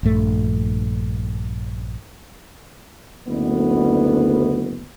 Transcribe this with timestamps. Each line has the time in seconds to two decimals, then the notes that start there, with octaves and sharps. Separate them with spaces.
0.03 A#1 G2 A3
3.27 F#1 D2 B3